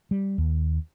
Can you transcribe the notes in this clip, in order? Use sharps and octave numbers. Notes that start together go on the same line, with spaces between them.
G3
D#2